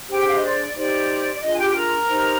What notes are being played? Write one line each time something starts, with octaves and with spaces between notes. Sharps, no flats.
D4 G4 G#4 C5 G5
G5
F5
D#5
D5
D#4 G4 C5 D5
D5
D4 F4 G#4 D#5
G#5
G4 G5
A#4 A#5
D#4 G4 C5